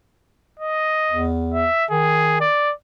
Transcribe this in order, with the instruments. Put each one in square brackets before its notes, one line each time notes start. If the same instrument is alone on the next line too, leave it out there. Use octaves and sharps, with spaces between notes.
[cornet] D#5
[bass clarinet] E2
[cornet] E5
[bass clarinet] D#3 [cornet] G#4
[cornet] D5